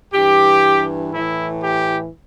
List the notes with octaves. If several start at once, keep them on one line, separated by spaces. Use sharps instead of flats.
G2 E3 G4
A2 E3 E4
G4